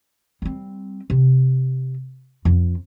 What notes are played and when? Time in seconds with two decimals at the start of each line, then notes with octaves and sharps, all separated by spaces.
0.42 G3 C4
1.10 C3
2.45 F2